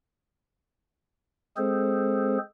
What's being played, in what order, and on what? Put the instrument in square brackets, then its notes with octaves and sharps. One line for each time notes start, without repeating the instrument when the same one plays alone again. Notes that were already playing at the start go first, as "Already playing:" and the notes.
[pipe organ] G#3 C4 G#4 A4 C5